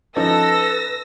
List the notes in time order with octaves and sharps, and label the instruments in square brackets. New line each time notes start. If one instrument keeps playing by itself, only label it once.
[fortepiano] F3 C#4 D#4 [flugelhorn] A4 [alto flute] B4 [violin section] E6 A#6